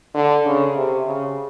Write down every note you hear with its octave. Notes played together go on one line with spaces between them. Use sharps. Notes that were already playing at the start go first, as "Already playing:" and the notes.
D3
C#3
C3
C#3